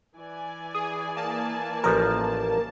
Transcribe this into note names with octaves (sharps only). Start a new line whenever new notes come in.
E3 D5 G#5
G#4 D#6
A#3 A5
A1 F3 A#4